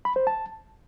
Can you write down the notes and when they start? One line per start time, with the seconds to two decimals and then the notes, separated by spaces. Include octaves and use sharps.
0.05 B5
0.16 C5
0.27 A5